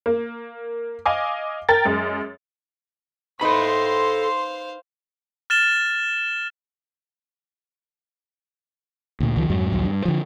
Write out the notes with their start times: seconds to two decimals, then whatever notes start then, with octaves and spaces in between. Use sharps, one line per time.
0.06 A#3
1.06 D#5 F5 G#5 D6
1.69 A#4 G5 A6
1.85 F#2 G#3
3.41 D#4 A4 B4 C5 F5 B5 C6
5.50 F6 A6 E7 G7
9.20 D2 A#2
9.36 C#2 D#3 F3
9.50 F2 G#2 F#3
9.72 A#1 D#2 F#3
9.85 G2
10.05 D3 F3